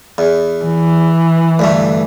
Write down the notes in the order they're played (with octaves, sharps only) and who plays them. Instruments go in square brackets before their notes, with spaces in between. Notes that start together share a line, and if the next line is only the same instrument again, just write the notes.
[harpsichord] E2
[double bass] E3
[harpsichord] D2 G2 A3